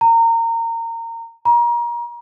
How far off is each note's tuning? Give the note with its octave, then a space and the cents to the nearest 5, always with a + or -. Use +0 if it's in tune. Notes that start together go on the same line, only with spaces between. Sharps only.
A#5 -25
A#5 +30